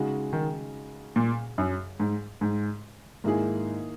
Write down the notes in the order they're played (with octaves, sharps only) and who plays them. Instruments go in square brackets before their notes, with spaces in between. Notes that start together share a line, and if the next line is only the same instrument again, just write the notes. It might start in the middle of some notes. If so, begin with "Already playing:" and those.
Already playing: [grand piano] C#3 G#3 D#4 F#4
[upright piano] D#3
A#2
F#2
G#2
G#2
[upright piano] G#2 [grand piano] D#3 A#3 E4 G#4